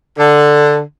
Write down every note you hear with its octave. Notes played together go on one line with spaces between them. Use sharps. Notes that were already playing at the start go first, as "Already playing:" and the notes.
D3